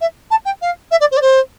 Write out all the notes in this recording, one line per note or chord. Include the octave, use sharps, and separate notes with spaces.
E5
A5
G5
F5
E5
D5
C5
D5
C5